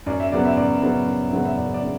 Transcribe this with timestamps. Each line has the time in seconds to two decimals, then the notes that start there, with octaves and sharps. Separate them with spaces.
0.06 F#2 D5
0.20 E5
0.32 C#3 F#3 B3 D5
0.45 E5
0.57 F#2 D5
0.82 C#3 F#3 B3
1.07 F#2
1.32 C#3 F#3 B3
1.45 E5
1.57 F#2 D5
1.74 D5
1.83 C#3